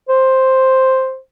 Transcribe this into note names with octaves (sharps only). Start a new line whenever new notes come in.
C5